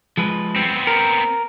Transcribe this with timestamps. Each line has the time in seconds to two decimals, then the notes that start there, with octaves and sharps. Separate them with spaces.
0.17 F3 G#3 B4
0.56 B3 C4
0.87 A#4